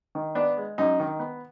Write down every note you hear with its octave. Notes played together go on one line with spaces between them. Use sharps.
D#3
B3 D4
G#3
F#2 D#4
D#3
B3